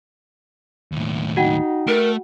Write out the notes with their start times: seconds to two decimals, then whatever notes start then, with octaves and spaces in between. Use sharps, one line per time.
0.92 D#2 A2
1.37 D#4 F#4 F#5 G5
1.87 A3 A#4